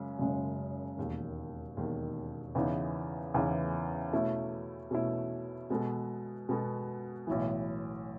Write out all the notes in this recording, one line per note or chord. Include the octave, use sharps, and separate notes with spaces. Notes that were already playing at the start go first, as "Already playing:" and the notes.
Already playing: F#2 C#3 G#3
F#1 F#2 C#3 G#3
E1 D#2 D#3
E1 D#2 D#3
E2 C#3 E3 B3 D#4
E2 C#3 E3 B3 D#4
B2 A3 C#4 E4
B2 A3 C#4 E4
B2 G#3 B3 F#4 A4
B2 G#3 B3 F#4 A4
B1 A2 E3